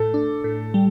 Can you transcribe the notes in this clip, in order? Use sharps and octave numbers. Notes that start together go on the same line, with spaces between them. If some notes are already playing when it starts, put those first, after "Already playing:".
Already playing: A2 A4
D4
A2
G3